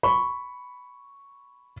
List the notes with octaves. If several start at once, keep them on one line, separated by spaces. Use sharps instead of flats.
B5 C#6